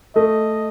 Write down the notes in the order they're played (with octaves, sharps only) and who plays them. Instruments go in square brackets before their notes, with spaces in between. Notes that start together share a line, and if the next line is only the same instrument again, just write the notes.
[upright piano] A3 [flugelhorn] D#5